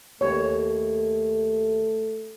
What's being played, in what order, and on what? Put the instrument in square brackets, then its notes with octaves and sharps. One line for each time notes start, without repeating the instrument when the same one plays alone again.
[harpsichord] D#2 [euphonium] A3 [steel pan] C#5